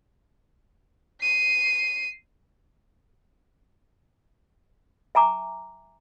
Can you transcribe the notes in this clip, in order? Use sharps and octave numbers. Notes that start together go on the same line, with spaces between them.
C7 D#7
E5 G#5 A#5 D6